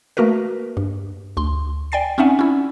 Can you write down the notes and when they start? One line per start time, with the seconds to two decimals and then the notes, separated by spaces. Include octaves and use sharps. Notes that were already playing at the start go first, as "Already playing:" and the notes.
0.17 A3 A#3 F#4 A#4 B4
0.77 G2
1.37 D2 C6
1.92 D5 G5 G#5 A6 C7
2.18 C4 C#4 D#4 E5 F#5 G#5
2.39 C#4 E4